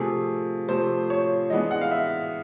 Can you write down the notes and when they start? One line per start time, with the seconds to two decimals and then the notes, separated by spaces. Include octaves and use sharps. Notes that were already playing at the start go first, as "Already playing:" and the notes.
Already playing: C3 F3 A3 G#4
0.68 C3 F3 A3 C5
1.10 C#5
1.50 E3 G#3 B3 D4 D#5
1.71 F#5
1.81 F5
1.91 E5